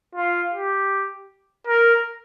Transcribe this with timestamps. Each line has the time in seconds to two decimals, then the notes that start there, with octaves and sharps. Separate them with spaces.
0.15 F4
0.54 G4
1.67 A#4